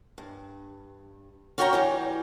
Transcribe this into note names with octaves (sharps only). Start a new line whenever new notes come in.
G2
C#4 F#4 C#5 G5 G#5 A#5
E3 G3 G4